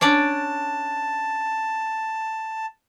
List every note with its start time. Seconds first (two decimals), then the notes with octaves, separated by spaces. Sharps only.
0.01 C#4 D4 D5 A5